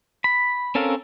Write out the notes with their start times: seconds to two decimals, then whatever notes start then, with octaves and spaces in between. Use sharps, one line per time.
0.24 B5
0.75 C4 C#4 A4 A#4 F5